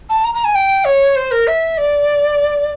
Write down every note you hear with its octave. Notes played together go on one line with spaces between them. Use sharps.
A5
A#5
A#5
G#5
G5
C#5
C5
A#4
E5
D5